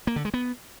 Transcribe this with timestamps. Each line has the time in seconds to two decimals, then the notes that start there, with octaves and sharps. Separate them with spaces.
0.07 A#3
0.16 D3
0.25 G#3
0.34 B3